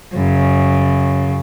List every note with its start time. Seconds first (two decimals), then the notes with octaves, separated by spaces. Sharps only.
0.14 F#2 C#3